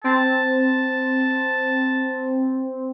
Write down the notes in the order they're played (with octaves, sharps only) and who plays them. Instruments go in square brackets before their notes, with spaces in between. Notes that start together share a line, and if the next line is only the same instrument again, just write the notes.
[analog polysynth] C4 [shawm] A5